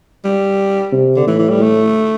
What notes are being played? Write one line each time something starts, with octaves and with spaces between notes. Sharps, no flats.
G3
C3
D3
A2 E3
E3
G3
A3